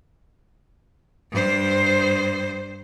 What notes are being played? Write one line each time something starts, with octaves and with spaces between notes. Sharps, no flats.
G2 C5